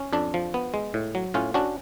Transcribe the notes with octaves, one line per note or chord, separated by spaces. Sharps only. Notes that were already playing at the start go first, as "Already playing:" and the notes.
Already playing: C#4
F2 D4
F3
B3
G#3
A2
F#3
A2 C#4 F4
C#4 D4 F#4